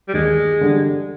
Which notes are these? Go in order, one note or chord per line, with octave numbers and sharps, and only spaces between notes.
G3
D#2 G#3
D3 G3